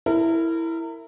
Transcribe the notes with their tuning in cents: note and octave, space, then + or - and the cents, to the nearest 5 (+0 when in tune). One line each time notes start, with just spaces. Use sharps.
E4 +0 A#4 -30